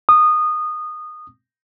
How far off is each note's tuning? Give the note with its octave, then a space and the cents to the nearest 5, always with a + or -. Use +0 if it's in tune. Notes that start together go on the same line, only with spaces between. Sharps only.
D#6 -20